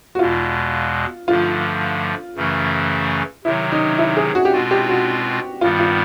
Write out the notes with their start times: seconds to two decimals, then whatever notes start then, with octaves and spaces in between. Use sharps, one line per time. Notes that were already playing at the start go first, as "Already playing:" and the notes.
0.15 F#4
0.19 E2 B2 G#3 F4
1.28 G2 D3 F3 A3 F4
2.36 F#2 C#3 E3 A3 C#4
3.45 C3 D#3 F#3 E4
3.72 D#4
3.98 E4
4.17 G#4
4.35 F#4
4.45 G4
4.53 B2 G#3 C4 F4 F#4
4.71 G4
4.89 F#4
5.61 G2 D#3 G3 B3 F4
5.79 F4